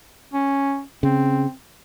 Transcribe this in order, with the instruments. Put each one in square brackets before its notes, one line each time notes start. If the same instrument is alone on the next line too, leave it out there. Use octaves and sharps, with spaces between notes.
[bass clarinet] C#4
[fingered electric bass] C#3 [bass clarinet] C4